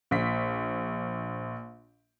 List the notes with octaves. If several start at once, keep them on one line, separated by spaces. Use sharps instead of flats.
A#1 B6